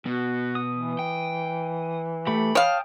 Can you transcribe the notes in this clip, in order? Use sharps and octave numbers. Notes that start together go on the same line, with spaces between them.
B2 F#4
D#6
E3
G5
A3 G4 B5
C#5 F5 G5 A5 D#6